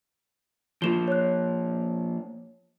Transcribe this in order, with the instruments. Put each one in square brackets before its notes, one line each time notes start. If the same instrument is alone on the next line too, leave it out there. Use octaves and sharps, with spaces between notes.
[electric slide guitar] F3 A#3 [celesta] F4 E7 G7
[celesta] C#5 F#6